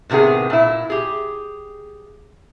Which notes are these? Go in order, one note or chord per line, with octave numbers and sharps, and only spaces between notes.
A2 C3 D#3 B3 G#4
A#2 E4
G4 G#4